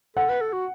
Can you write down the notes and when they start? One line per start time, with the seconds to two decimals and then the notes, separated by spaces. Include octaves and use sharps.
0.16 A4 F#5
0.29 B4
0.41 A4
0.53 F#4